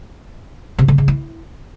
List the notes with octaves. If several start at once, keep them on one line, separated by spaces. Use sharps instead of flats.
C3
D3
C#3
E4